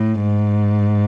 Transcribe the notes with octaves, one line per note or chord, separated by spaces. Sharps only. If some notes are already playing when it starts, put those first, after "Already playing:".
Already playing: A2
G#2